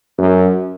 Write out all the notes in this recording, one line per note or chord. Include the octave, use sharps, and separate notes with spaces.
F#2